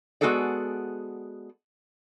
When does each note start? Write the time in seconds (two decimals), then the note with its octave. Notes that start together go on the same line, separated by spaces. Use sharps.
0.21 G#3 B3 F#4 G#4 A4 D5